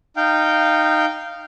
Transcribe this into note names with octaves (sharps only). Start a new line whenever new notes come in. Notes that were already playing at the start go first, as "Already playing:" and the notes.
D#4 F5 G5